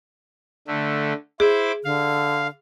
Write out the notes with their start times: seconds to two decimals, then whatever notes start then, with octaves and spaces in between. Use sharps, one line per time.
0.68 D3 A3
1.40 E4 G#4 C5 D6
1.84 D3 F5